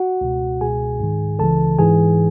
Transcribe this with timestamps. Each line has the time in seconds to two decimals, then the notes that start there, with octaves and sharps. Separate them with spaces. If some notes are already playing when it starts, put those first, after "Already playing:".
Already playing: F#4 F#5
0.21 C#2 B2
0.61 C#2 B2 G#4 G#5
1.00 G#2 D#3
1.39 C#2 C#3 E3 A4 A5
1.79 G#2 E3 G#4 G#5